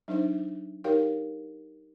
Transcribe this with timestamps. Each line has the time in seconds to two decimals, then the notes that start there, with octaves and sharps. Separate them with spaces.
0.08 F#3 D4 D#4 C5 E5
0.84 D#4 G4 A#4 C#5 F5 G5